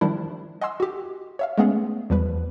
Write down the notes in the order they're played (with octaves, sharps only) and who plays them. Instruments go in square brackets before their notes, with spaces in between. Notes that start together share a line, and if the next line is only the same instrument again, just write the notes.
[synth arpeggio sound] D#3 F3 G3 D4 E4
D#5 F#5 G#5 C6 E6
F#4 G4
C#5 E5 F5
G#3 A3 B3 C#4 G#4
E2 F3 G3 B4